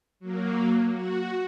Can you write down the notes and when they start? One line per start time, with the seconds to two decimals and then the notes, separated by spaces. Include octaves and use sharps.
0.20 F#3 A#3
0.92 F#4